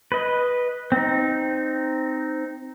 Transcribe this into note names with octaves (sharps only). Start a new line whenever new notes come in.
B4 D#5
C4 D#4